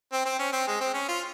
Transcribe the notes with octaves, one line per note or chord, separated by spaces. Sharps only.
C4
C4
C#4
C4
G#3
C4
C#4
F4